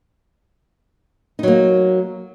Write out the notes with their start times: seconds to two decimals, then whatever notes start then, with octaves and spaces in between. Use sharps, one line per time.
1.39 D#4
1.43 F#3
1.48 A#3